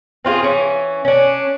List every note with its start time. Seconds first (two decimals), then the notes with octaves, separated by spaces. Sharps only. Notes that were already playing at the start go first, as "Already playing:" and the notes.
0.25 C4 F4 F#4 G#4
0.43 E3 C#4
1.05 C#4 D4